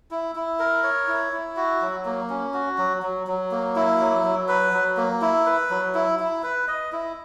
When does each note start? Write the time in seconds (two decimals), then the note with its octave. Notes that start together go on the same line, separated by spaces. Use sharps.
0.11 E4
0.35 E4
0.59 A#4
0.83 C#5
1.08 E4
1.32 E4
1.56 F#4
1.81 F#3
2.05 A#3
2.30 C#4
2.54 F#4
2.78 F#3
3.03 F#3
3.27 F#3
3.51 A#3
3.76 E4
4.00 F#3
4.24 F#3
4.48 B4
4.73 F#3
4.97 A#3
5.21 E4
5.46 B4
5.70 F#3
5.94 E4
6.19 E4
6.43 B4
6.68 D#5
6.92 E4